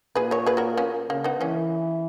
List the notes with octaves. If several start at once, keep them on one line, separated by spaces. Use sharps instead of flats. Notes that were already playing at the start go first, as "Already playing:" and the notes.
A#2 G#4 B4
A#4 C#5
G#4 B4
F#4 A#4
A#3 C#4
C#3 A#3
B3 D#4
E3 A#3 C#4